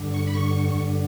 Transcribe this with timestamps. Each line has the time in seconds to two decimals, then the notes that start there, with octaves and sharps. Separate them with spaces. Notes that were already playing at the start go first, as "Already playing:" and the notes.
Already playing: G2 D3
0.14 C#6
0.27 B5
0.34 D3 C#6
0.75 G2